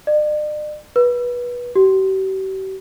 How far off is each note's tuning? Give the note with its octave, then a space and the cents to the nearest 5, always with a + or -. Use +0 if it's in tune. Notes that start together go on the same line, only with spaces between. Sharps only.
D5 +45
B4 -20
G4 -45